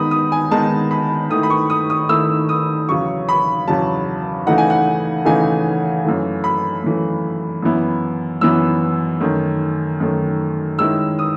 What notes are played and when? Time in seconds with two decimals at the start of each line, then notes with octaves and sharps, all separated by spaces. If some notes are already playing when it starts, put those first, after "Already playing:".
Already playing: D#3 G#3 B3 D#4 B5 D#6
0.11 D#6
0.32 G#5
0.51 D#3 G#3 B3 D#4 A5
0.91 B5
1.30 D#3 A3 E4 D#6
1.43 B5
1.50 C#6
1.70 D#6
1.90 D#6
2.09 D#3 A3 E4 E6
2.49 D#6
2.89 E2 C#3 F#3 C#6
3.29 B5
3.67 E2 C#3 F#3 A5
4.47 C#3 E3 A3 D#4 F#5
4.58 G#5
4.70 F#5
5.25 C#3 E3 A3 D#4 G#5
6.05 F#2 E3 A3
6.44 B5
6.84 F#2 E3 A3
7.63 F#2 E3 B3 E4
8.41 F#2 E3 B3 E4 E6
9.20 F#2 D#3 A3
10.00 F#2 D#3 A3
10.79 D#3 G#3 C#4 E4 E6
11.19 D#6